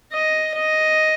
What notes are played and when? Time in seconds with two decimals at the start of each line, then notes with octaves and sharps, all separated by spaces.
0.12 D#5
0.56 D#5